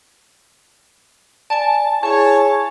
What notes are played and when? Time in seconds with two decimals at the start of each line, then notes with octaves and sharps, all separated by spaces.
1.50 D5 G#5 A5
2.03 E4 G#4 C#5 G#5 A5